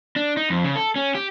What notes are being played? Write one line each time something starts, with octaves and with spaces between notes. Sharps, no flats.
D4
D#4
F2
C#3
A4
C#4
G4